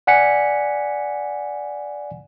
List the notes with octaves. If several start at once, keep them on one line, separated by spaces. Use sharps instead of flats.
D5 F#5 G#5 B6 C#7